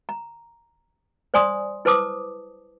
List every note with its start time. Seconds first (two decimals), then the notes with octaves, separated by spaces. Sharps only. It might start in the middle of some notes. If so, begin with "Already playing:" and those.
0.09 A#5
1.34 C5 D5 G#5 C6 D#6
1.85 E4 B4 C5 A5 D6 D#6